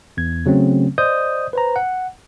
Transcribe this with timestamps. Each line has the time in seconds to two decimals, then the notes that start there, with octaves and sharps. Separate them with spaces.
0.17 E2 G#6
0.46 C#3 F#3 A3 C4 C#4
0.98 C5 D5 D#5 D#6 G6
1.53 B4 C5 A#5
1.76 F#5